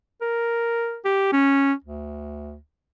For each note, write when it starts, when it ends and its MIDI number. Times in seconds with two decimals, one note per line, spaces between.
0.22 0.98 70
1.05 1.32 67
1.33 1.73 61
1.85 2.57 38